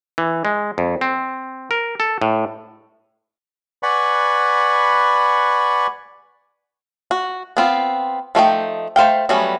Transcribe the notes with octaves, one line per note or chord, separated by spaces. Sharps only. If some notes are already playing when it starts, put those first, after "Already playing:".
E3
G#3
F2
C4
A#4
A4
A2
B4 D5 F#5 G#5 B5 C#6
F#4
B3 C4 F4
F3 A3 D#4 G5
A3 C5 F5 G5
F#3 G3 A3 B3 C#4